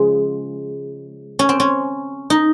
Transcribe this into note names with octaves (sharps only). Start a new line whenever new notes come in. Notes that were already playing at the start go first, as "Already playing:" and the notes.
Already playing: C#3 F3 G#3
C#4
C4
C#4
D#4